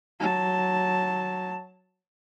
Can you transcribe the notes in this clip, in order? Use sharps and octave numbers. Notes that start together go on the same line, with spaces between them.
F#3 A5